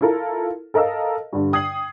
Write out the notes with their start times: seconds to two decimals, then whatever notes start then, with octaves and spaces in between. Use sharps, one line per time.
0.01 E4 F4 A4 A#4
0.74 A4 A#4 D#5 F5 E6
1.33 G2 D3
1.53 G5 D#6 G#6 C7 F#7